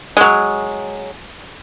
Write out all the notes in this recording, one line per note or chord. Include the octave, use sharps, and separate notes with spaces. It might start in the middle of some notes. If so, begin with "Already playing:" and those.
F#3 G#3